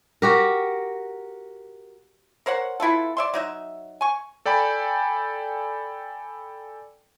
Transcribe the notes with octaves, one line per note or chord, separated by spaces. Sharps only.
F#4 G4 A#4
A#4 C5 C#5 F#5
B3 E4 F4 A4
D5 E5 C6
F#3 D#4 E5
G#5 C#6
A4 D5 G5 G#5 B5